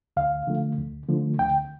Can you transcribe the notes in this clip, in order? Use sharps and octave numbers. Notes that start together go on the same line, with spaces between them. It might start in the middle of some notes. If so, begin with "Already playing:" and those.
D2 F5
D3 F3 A3
D2
D3 F3 A3
D2 G5